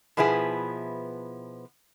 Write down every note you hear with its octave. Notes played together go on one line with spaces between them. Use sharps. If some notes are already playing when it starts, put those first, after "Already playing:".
B2 F3 B3 E4 G#4